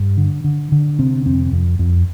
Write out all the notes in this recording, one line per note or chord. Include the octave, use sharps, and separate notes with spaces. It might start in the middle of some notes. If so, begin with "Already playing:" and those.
Already playing: G2
D3
D3
D3
C3 C4
F2 C4
F2
F2